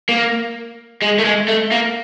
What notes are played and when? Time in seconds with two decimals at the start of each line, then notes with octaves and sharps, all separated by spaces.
0.09 A#3
1.02 G#3
1.19 A3
1.24 G#3
1.48 A3
1.71 A#3